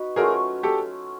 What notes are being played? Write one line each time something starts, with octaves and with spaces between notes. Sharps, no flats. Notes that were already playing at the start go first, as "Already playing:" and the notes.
Already playing: D#4 F#4 B4
F#3 A3 C#4 F4 G#4 A#4
G4 A4